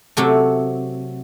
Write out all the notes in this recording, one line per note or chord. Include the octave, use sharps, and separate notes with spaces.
C3 F#3 A3